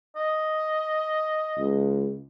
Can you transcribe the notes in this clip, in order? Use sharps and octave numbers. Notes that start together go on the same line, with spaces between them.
D#5
C#2